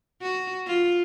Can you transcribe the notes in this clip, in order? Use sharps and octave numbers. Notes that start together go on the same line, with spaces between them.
F#4
F4